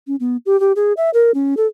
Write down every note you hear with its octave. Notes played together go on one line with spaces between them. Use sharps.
C#4
B3
G4
G4
G#4
E5
A#4
C#4
A4